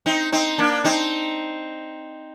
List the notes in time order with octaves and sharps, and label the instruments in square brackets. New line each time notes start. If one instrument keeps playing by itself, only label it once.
[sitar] C4 D#4
C4 D#4
A#3 D4
C4 D#4